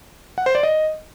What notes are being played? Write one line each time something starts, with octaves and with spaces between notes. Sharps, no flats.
F#5
C5
D5
D#5